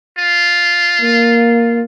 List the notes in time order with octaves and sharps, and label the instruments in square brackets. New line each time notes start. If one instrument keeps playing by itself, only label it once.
[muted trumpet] F4
[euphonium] A#3